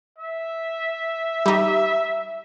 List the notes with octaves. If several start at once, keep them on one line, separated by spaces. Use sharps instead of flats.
E5
G3 D#4